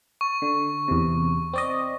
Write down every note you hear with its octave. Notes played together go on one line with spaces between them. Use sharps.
C#6
D3
E2 C3
C4 D5 D#5